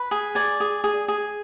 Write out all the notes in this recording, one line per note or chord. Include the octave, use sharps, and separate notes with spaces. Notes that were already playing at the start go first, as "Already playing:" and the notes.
Already playing: B4
G#4
D5 G#5
G#4
G#4
G#4